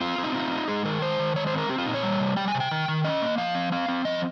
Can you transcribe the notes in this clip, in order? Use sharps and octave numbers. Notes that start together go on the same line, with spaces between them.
C4 F4
C4
D#4
D#4 F4
D#4
G#3 G#4
D#3 A#4
G#3 C5
D#3
G#3 C#5
C5
C4 A#4
C4 G4
F4
A#2 D#4
C#5
G3
C3
G3 G5
G#5
C3
G5
D#3
D#3
C#4 D#5
A#3
F3 F5
C4
C4 F5
C4
F3 D#5